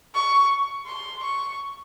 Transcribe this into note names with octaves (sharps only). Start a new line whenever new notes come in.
C#6
C6
C#6